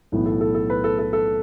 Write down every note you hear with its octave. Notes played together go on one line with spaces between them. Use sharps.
B1 A2 E3 B3
A4
A4
A4
B4
A4
A4
A4